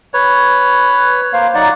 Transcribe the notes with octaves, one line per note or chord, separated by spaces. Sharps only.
B4 C#5
A#3 C5 F5
F#3 D#4 D5 F#5